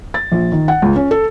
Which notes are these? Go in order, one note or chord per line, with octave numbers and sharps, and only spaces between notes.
A6
A#1
D#3
F#5
C#2
C#4
A4